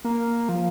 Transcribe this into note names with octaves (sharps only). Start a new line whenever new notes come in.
A#3
F3